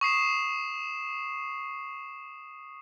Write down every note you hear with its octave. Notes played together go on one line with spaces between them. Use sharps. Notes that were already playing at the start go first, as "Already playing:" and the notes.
C#6 D#6 C7 E7